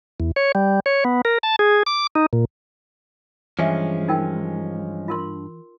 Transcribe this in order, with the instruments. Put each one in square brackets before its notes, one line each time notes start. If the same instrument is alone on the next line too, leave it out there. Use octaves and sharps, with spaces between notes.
[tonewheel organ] E2
C#5
G3
C#5
B3
A#4
A5
G#4
D6
D#4
A#2
[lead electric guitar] G2 [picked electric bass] E3 [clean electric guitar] F3 G#3 C#4 [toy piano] G#4 E5
[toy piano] D#4 A#4 G5
F4 A#4 C6